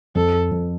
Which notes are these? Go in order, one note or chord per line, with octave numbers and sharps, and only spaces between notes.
F2 A4
F2